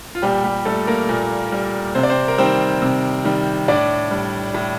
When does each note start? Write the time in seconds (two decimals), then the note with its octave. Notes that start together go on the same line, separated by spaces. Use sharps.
0.15 F4
0.22 A#2 G3 G4
0.44 G3 G4
0.65 G3 A3 A4
0.87 A#3 A#4
1.09 A#2
1.52 G3
1.95 C3 C5
2.03 D5
2.10 C4 C5
2.28 A#4
2.38 D#3 G3 C4 C5
2.82 C3
3.24 D#3 G3
3.68 A2 D4 D5
4.11 G3
4.54 A2